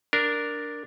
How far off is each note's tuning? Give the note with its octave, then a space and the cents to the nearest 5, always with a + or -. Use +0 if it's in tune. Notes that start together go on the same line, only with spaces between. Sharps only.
D4 +0 A#4 +0